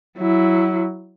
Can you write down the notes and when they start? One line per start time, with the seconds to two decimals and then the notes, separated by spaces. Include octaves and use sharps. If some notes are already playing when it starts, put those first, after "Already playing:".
0.17 F#3 E4